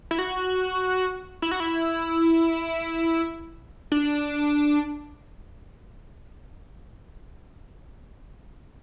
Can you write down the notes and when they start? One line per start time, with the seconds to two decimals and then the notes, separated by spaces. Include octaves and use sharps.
0.11 E4
0.19 F#4
1.42 E4
1.51 F#4
1.60 E4
3.92 D4